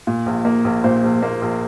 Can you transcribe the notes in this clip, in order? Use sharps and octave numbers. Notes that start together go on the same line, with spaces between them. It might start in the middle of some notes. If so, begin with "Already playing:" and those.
A#2
A#1
A#3
A#1
A#2 C5
A#1
A#3
A#1